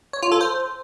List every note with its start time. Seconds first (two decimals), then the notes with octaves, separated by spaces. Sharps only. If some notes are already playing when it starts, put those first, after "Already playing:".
0.13 C#5
0.23 F4
0.32 A4
0.41 C5